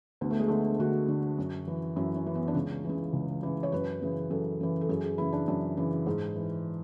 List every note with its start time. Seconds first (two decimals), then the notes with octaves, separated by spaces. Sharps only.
0.21 D2 B3
0.30 A3
0.39 G#3
0.48 D3 A3
0.79 D2 F#4
1.08 D3
1.38 F#2
1.67 E3
1.96 F#2 E4
2.16 C#4
2.26 E3
2.35 B3
2.48 D4
2.55 C#2 C#4
2.84 C#3 E3
3.13 C#2
3.43 C#3 E3
3.63 C#5
3.72 F#2 B4
4.02 C#3 E3
4.30 F#2 A4
4.61 C#3 E3
4.81 A4
4.89 F#2 G#4
5.04 G#4
5.18 C#3 E3 E4
5.33 D4
5.48 F#2 D4
5.77 C#3 E3
6.06 G#2
6.35 E3